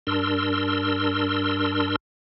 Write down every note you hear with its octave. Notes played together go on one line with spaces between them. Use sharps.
G2 D4 A#4 C6 E6